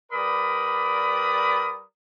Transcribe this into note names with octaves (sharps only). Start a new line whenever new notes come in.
G3 A#4 B4 D5 B5 D#6